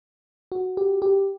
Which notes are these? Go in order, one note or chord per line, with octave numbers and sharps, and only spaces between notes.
F#4
G4
G4